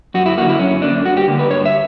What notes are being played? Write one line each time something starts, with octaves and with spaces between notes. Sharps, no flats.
F#2 F#4
E4
D3 A#3 F#4
E4
F#2 C#4
D3 A#3 D4
G2 F#4
G4
D3 A#3
B4
G2 C#5
E5